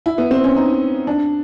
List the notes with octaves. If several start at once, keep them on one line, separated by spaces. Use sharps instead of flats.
E4
B3
C4
C#4
D#4
D4